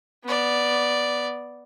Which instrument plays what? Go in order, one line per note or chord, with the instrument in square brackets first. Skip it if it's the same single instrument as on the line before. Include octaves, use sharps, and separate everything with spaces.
[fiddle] B3 D5